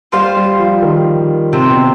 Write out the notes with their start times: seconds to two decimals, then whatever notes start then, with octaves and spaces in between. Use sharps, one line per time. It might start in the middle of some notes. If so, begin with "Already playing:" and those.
0.12 G3 F4 C5 F5
0.36 G3
0.59 F3
0.83 D#3
1.53 C3 C4 F4 C5
1.70 B2